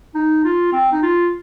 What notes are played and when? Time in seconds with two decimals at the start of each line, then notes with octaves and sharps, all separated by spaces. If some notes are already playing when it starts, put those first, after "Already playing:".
0.15 D#4
0.44 F4
0.73 C4
0.92 D#4
1.02 F4